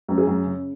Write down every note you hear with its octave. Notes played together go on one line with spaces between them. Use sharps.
F#2
G#4
F#2
C#3